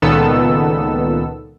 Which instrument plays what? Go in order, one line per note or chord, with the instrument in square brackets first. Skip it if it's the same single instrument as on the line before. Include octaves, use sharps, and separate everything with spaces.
[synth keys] C#2 A#2 D#3 B3 A4 E6